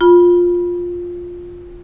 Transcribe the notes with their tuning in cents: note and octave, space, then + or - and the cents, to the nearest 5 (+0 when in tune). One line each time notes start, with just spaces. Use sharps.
F4 +10 B5 -20